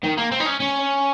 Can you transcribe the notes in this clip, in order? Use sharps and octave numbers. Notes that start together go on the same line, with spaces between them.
D#3
A#3
C4
D#4
C#4
C#4